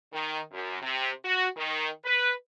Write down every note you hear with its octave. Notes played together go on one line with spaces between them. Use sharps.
D#3
F#2
C3
F#4
D#3
B4